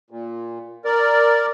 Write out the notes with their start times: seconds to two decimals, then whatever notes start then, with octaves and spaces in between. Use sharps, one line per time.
0.10 A#2
0.85 A#4 D5